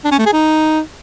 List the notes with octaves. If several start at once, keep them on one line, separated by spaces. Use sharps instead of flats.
D4
C#4
A3
G#4
D#4